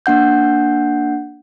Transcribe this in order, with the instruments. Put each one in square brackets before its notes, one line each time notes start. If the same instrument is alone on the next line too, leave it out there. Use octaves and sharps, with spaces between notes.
[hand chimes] A#3 D4 F#5 G6